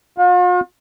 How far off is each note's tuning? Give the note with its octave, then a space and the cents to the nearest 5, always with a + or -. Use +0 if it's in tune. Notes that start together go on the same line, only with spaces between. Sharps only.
F4 +45